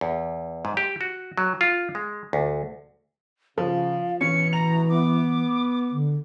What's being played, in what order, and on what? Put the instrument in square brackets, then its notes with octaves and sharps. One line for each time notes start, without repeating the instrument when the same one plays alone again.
[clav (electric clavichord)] E2
G#2
G4
F#4
F#3
F4
G#3
D2
[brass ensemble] C#3 [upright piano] F3 [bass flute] F5
[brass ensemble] A1 B2 [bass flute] E3 [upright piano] C#4 [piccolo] C#7
[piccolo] A#5 [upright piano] F7
[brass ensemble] B3 [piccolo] D6
[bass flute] D3